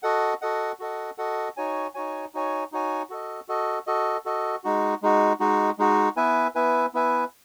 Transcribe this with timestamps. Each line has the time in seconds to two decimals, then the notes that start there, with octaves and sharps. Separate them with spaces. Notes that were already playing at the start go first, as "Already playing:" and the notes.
0.03 F#4 A4 D#5 F#5
0.42 F#4 A4 D#5 F#5
0.80 F#4 A4 D#5 F#5
1.18 F#4 A4 D#5 F#5
1.57 D#4 F#4 C#5 G#5
1.94 D#4 F#4 C#5 G#5
2.34 D#4 F#4 C#5 G#5
2.72 D#4 F#4 C#5 G#5
3.10 F#4 A4 D#5
3.48 F#4 A4 D#5
3.87 F#4 A4 D#5
4.25 F#4 A4 D#5
4.64 G#3 D#4 F#4
5.02 G#3 D#4 F#4
5.40 G#3 D#4 F#4
5.79 G#3 D#4 F#4
6.16 B3 E4 B4 E5 G#5
6.55 B3 E4 B4 E5 G#5
6.94 B3 E4 B4 E5 G#5